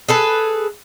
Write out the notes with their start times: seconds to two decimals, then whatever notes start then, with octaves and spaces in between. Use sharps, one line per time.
0.09 G#4 A4 B4